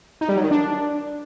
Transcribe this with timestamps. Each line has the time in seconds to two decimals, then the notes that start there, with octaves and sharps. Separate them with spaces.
0.21 D#4
0.29 G3
0.36 F#3
0.44 D#3
0.51 D4